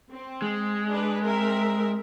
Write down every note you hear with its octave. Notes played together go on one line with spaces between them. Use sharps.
C4
G#3
D4 B4
C4 A#4 E5